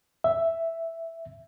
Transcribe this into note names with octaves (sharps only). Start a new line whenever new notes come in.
E5